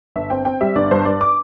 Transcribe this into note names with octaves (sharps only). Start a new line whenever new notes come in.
G1 E5
C4 G5
C4 G5
G3 E5
G1 D5
G2 C5
G2 D5
D6